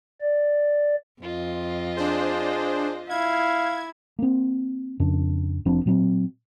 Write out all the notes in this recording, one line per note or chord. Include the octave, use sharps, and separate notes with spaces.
D5
F2 F4 D#5
D4 G#4 C5
E4 F5 G#6
A#3 C4
F2 C#3 D4
F1 F3 C4 D4
A#2 F#3 C4